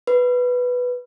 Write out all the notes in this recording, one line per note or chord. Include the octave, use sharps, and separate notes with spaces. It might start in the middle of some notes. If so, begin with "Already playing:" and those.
B4